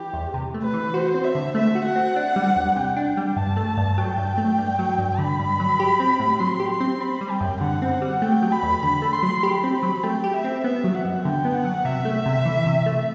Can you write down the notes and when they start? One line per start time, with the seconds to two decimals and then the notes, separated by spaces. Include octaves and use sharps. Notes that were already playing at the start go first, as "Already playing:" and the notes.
Already playing: E3 G4
0.14 E2
0.34 C3
0.54 A3
0.64 B4
0.74 E3
0.94 F#4 C5
1.14 C4
1.24 E5
1.35 D3
1.55 A3 E5
1.75 F#4
1.85 F#5
1.96 C4
2.16 D4
2.36 G3
2.56 E2
2.76 C3 G5
2.96 D4
3.17 G3
3.36 G2 A5
3.57 A3
3.77 G2
3.97 F#3 G5
4.18 G2
4.38 A3
4.58 G2
4.79 F#3
4.98 G2
5.18 D3 B5
5.39 G2
5.60 F#3
5.80 G4
6.00 C4
6.19 A2
6.40 F#3 C6
6.60 G4
6.70 C6
6.81 C4
7.00 C4 B5
7.21 G3
7.31 G5
7.41 F#2
7.61 D3 F#5
7.82 C4
7.92 F#5
8.02 G3
8.22 A3 G5
8.42 F#3
8.52 B5
8.63 E2
8.82 D3 B5
9.02 A3
9.13 C6
9.23 F#3
9.43 G4 B5
9.64 C4
9.83 F#3
10.04 A3 G5
10.24 G4
10.34 E5
10.44 C4
10.64 B3 E5
10.84 F#3
10.95 F#5
11.05 F#2
11.25 D3 G5
11.45 B3
11.55 F#5
11.65 F#3
11.85 C3 E5
12.05 A3
12.26 C3
12.45 E3
12.66 C3
12.86 A3